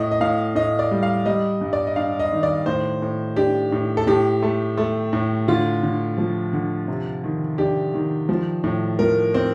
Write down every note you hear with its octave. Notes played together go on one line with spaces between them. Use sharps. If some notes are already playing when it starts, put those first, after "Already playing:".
Already playing: A2 D#5
D#5
A2 F5
A2 D#5
D5
G3
F5
G3 D#5
G2
D5
D#5
D4 F5
D#5
D#3
D5
A2 C5
A2
D4 G4
A2
A4
A2 G4
A3
A3
A2
D3 F4
D3
F3
D3
C3
D#3
D4 G4
D#3
F3
A2
F3 A#4
C4